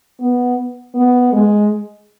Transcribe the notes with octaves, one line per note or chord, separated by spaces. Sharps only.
B3
B3
G#3